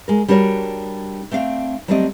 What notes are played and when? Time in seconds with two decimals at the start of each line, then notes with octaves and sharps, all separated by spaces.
0.08 G#3 A#4
0.28 G3 D4 F#4 A#4 C#5
1.31 A3 C4 D4 F5
1.88 F#3 G3 A3 C4 D5 D#5